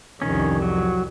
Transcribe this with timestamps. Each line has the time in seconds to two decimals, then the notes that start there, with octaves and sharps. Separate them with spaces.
0.22 C2 F2 D#3 C#4
0.62 F#3